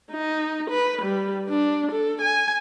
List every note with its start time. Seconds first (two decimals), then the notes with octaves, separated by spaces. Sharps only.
0.12 D#4
0.71 B4
1.02 G3
1.49 D4
1.92 A4
2.22 G#5